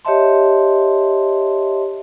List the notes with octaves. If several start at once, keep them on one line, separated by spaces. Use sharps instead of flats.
G4 C#5 D#5 E5 A5 C6